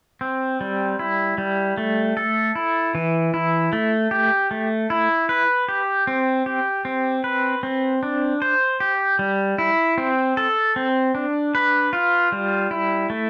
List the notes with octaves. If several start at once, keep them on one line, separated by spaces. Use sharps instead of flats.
C4
G3
E4
G3
A3
A4
E4
E3
E4
A3
G4
A3
E4
B4
G4
C4
G4
C4
B4
C4
D4
C5
G4
G3
E4
C4
A4
C4
D4
B4
F4
G3
E4
A3